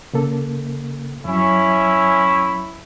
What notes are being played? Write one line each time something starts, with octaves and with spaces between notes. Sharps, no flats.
C#3 A#3 A4
F2 F#3 C#4 E4